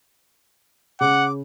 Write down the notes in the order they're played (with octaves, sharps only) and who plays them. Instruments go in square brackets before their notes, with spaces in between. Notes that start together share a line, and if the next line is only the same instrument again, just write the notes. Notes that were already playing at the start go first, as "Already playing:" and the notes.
[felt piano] C#3 [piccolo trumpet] F#5 [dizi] D6